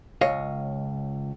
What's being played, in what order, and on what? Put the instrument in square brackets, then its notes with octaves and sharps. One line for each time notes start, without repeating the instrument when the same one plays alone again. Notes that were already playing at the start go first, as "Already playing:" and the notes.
[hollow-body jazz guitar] C#2 C#5 D#5 F5